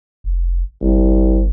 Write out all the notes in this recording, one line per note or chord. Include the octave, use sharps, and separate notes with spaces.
F1
G1 C2